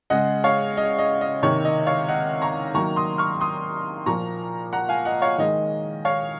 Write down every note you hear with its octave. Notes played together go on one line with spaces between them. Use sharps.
C#3 G#3 D#5 F#5
C#5 F5
D#5
D#5
D#5
C3 D#3 A#3 C#5
D#5
C#5 F5
D#5 F#5
A#5 C#6
D#3 F#3 A#3 A#5 C#6
C6 D#6
C#6 F6
C6 D#6
A#2 F3 A#3 A#5 C#6
F#5 A#5
F5 G#5
D#5 F#5
C#5 F5
D#3 G#3 D#5
C#5 F5